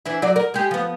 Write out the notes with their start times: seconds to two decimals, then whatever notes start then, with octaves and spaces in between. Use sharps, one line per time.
0.06 E3 D4 E4
0.22 F#3 D5
0.36 A#4
0.54 G#3 G4
0.71 F3 B3